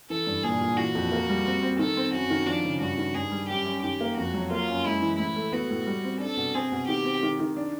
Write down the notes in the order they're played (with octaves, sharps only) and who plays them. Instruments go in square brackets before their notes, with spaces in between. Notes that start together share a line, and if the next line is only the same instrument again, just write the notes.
[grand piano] E3 [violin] A4
[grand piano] G2
[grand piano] A#2 [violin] G#4
[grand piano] A#2
[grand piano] E3 [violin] F#4
[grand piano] F2
A#3
G3
C4
C4
[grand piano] D#3 [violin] A4
[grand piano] C4
[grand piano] F#2 [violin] F#4
[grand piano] D#3
[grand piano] F3 [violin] D4
[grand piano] C#3
[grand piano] G2 [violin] F#4
[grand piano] D#3
[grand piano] G2 [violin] G#4
[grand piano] G3
[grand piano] F#2 [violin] G4
[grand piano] F#2
[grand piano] D#3 [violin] G4
[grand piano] A#3
[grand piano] F2 [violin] F#4
[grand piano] F#3
[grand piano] A#3 [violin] F4
[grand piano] F#2
[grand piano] G#3 [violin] E4
[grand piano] E3
[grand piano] A2 [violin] E4
[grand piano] A3
[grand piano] B3 [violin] F#4
[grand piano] A2
G3
C4
[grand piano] D4 [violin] A4
[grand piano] B2
[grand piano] C4 [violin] G#4
[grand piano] B2
[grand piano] D#3 [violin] G4
[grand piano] C4
D#3
D#3
D4